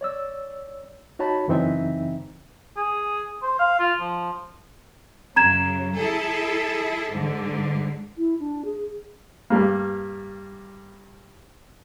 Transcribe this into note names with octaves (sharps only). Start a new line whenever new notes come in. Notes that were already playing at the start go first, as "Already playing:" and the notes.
C#5 D5 E6
D#4 F#4 C#5 A5 B5
F#2 C#3 E3 C4 D#4 E5
G#4
C5
F5
F4
F3
F#2 C#3 A#5 G#6 E7
E4 G#4 A4
G#2 D3
E4
D4
G#4
G2 G3 A#3